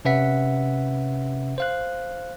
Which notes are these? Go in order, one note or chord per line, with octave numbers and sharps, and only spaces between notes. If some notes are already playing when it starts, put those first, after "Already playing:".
C3 C#4 B4 E5 F#5 B6
C5 F5 F#6